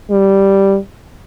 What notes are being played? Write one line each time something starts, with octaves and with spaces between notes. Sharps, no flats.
G3